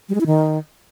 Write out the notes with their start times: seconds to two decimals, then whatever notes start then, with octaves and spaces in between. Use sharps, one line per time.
0.09 G3
0.15 G#3
0.21 E4
0.26 D#3